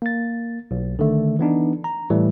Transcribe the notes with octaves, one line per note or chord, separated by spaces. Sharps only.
A#3 A6
B1
D3 D#3 A3
E3 B3 D4 D#4
A#5
A2 E3 G3 A3